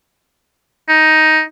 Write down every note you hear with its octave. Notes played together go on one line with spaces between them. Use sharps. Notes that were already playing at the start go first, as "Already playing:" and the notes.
D#4